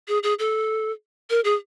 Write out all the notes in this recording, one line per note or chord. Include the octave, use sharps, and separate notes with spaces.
G#4
G#4
A4
A#4
G#4